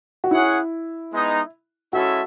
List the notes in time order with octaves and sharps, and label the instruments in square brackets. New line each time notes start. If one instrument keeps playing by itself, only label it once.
[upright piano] F#4
[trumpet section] C#4 G#4 C#5 F#5 [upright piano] E4
[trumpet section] G#3 B3 D#4
[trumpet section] G#3 C#4 E4 A4 E5 [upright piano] F#4